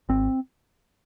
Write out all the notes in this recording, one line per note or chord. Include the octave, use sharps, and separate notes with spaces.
G#1 C4